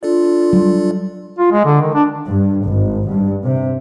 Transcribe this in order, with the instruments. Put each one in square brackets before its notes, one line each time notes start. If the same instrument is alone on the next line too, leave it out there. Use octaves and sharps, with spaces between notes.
[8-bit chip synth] D4 A4 D5 [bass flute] F4
[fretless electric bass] F#3 G3
[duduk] F4
G#3
D3
D#3
D4
[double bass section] G2
G#1
G2
C3